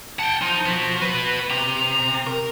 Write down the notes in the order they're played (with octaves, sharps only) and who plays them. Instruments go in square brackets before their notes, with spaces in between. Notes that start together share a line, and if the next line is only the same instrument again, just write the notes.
[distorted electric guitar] F#5 G5 [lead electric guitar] A5
[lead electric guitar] F3 [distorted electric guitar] D#4
[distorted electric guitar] B3 F#4
[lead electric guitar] B4
[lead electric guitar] C3 [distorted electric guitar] A#5
[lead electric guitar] A#4